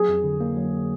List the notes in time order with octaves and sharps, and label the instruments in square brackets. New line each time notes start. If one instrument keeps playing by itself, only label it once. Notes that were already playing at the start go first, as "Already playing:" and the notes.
Already playing: [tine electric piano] F#3 [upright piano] G#4
[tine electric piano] F2
D3
A#3
F#3